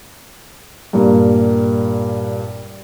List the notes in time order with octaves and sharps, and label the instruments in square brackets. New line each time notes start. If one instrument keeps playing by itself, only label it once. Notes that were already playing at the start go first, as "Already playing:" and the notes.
[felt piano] G2 A#2 A#3